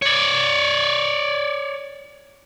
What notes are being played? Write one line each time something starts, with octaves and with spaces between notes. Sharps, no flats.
C#5 D5